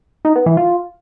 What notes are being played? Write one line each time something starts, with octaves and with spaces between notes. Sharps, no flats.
D#4
B3
E3
F4